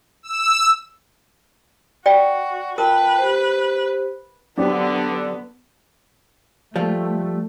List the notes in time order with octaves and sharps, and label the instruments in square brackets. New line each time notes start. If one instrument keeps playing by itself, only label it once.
[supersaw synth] E6
[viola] F#4 [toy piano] D5 G5
[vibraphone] F4 G5 A5 [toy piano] A#4 [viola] B4
[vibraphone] G4 C5
[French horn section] D3 [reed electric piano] F#3 C4 G4 [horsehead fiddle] B3 [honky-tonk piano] D4
[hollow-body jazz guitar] F3 G3 F4 [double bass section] A3